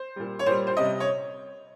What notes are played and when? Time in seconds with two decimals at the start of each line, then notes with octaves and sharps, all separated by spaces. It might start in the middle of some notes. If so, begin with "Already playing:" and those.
Already playing: C5
0.16 A#2 G3
0.39 C#5
0.46 A#2 G3 C5
0.67 C5
0.77 C3 G3 D#5
1.00 C#5